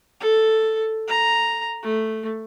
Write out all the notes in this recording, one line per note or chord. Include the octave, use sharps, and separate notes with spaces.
A4
A#5
A3